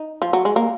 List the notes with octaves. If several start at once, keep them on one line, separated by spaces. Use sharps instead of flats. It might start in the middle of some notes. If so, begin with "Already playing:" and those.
Already playing: D#4
F3
F#3
G#3
A#3